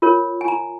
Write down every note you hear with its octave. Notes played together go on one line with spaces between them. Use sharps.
F4 A#4 C#5
G#5
A#5